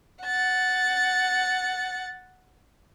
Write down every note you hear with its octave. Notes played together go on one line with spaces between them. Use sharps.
F#5 A6